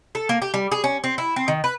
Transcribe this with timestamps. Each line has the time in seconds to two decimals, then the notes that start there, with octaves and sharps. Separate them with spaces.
0.15 A4
0.29 A#3
0.42 G4
0.54 G3
0.72 G#4
0.84 C#4
1.04 C4
1.18 E4
1.36 C4
1.48 D#3
1.64 B4